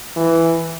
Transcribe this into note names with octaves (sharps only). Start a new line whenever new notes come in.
E3